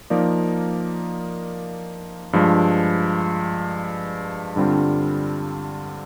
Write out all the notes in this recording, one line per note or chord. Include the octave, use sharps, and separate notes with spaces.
F3 A#3 D#4 A#4 D5
G2 F3 G#3
G2 D3 G3 C4 F4